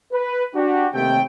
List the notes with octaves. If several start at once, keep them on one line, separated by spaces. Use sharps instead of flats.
B4
D4 F#4 G4
D#2 C3 A3 G5